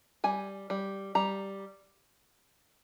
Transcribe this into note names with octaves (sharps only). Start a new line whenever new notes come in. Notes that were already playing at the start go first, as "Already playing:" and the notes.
G3 G#5
G3
G3 A#5